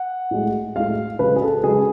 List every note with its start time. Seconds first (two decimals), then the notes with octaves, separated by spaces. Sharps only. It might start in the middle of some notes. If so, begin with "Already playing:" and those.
Already playing: F#5
0.31 A2 G#3
0.76 A2 G#3 F5
1.19 C#3 G#3 B4
1.36 G#4
1.42 A4
1.64 C#3 G#3 G#4